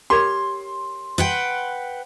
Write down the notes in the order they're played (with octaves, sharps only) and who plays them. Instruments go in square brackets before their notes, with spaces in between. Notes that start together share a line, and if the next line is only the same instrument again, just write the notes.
[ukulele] G4 A#4 C#5 [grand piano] C6
[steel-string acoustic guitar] B4 F#5 G5